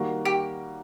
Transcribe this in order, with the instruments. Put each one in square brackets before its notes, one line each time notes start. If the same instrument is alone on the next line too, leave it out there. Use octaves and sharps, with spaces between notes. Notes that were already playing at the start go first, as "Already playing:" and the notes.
Already playing: [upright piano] D#3 G3 A#3 F#4
[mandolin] G4